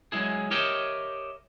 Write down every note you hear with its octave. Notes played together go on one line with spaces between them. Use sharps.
F#3 G#3 E4 G#4
G4 A#4 C#5 D#5 E5 G5